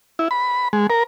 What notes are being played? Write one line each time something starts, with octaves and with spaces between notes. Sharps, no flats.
E4
B5
G#3
A#4